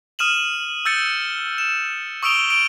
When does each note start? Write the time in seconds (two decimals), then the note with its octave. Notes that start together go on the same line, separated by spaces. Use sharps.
0.19 D#6 F6 D#7 E7 F#7
0.85 E6 G6 A6 C#7
1.58 E7
2.23 C#6 D#6 E6 D7 F7 G7
2.50 D7